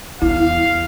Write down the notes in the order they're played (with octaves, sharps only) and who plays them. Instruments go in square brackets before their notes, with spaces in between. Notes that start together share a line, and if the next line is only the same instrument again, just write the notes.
[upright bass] E2 [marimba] E4 [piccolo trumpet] F5